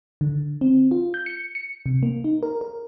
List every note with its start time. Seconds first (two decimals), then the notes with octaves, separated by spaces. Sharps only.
0.21 D3
0.61 C4
0.91 F4
1.14 G6
1.26 C#7
1.55 C#7
1.86 C3
2.03 A#3
2.24 D#4
2.43 A#4
2.61 A#4